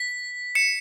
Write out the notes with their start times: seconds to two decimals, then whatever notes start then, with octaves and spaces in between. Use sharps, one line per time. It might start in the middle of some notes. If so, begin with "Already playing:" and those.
Already playing: B6
0.55 C#7 E7